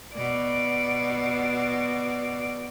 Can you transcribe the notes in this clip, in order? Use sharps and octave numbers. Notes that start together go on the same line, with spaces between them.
B2 D5